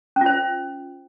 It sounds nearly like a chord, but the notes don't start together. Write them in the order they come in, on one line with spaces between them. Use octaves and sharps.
C#4 F4 C5